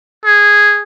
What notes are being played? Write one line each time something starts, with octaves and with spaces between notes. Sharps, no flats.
G#4